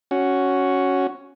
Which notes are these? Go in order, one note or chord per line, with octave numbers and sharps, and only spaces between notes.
C#4 F#4